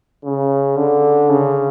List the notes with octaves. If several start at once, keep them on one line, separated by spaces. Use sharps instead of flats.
C#3
D3
C#3